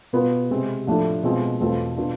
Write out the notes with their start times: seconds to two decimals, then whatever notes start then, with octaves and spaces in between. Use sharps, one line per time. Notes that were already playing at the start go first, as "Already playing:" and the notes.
0.13 B2 B3 F4
0.50 C3 G#3 C4
0.87 A2 F3 A3 D4
1.23 B2 G#3 C4 F4
1.60 E2 B2 A3 C4 F4
1.97 B2 B3 D4 F4